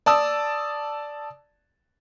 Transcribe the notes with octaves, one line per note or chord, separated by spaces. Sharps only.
D5 A5 D#6 E6